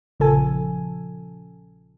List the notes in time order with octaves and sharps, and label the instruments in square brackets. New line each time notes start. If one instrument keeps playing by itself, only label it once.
[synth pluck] A#1 C#3 F3 A4 G#5